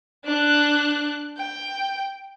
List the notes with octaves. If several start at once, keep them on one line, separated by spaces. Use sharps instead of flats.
D4 F#6
G5